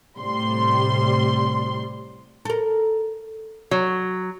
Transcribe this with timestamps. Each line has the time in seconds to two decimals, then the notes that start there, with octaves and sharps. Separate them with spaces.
0.18 A2 C3 G3 C6
2.45 A4 A#4
3.71 F#3